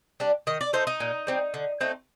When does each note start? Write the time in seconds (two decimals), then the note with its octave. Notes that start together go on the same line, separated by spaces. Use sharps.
0.20 G3 D4
0.47 D#3 D#5
0.61 D5
0.73 A3 D#4 C5
0.87 D#4
1.00 A#2
1.27 G3 C4
1.54 D3
1.81 A3 C4 D#4